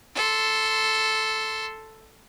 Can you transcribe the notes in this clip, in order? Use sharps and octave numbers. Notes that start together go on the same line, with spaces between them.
A4 C6